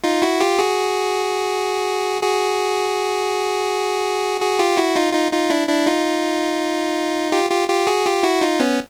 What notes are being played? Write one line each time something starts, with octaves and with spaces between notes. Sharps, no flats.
D#4 F4
E4 F#4
F4 G4
F#4 G#4
F#4 G#4
F#4 G#4
F4 G4
E4 F#4
D#4 F4
D#4 F4
D#4 F4
D4 E4
D4 E4
D#4 F4
F4 G4
F4 G4
F4 G4
F#4 G#4
F4 G4
E4 F#4
D#4 F4
B3 C#4